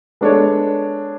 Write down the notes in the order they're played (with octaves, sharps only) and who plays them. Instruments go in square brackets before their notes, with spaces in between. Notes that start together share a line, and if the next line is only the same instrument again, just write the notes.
[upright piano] G#3 B3 D4 A4 C#5